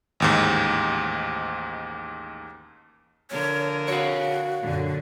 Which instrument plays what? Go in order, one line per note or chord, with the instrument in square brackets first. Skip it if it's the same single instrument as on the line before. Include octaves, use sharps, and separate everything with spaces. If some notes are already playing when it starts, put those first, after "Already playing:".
[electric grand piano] A1 D#2 G#2
[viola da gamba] D3 F3 A#4 [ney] C#5
[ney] F#4 [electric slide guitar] C#5 F5
[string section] F#2 A#2 D3